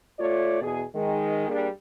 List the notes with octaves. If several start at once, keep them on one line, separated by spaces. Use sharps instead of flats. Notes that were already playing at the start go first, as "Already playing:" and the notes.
A3 F4 C#5 D5
E2 B2 G#4
D#3 G#3
G3 A#3 D4 G#4